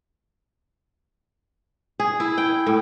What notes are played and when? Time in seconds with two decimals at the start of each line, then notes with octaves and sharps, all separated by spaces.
2.00 G#4
2.20 E4
2.38 G5
2.67 A2